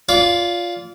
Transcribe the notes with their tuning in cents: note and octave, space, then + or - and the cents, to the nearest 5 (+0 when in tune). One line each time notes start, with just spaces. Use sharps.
F4 +0 D5 -30